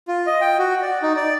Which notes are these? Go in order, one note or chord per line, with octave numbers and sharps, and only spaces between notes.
F4
D#5
G5
F#4
D5
D#4
D5